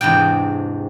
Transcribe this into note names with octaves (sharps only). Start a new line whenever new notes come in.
E2 G#2 C3 D4 G5